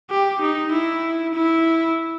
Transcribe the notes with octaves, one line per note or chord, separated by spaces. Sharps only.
G4
D#4
E4
E4